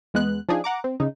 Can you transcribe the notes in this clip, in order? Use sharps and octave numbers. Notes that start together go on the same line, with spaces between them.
E2 G#3 B3 F#6
F3 D4 D#4 G#4
F#5 A#5 D6
C4
C#3 D#4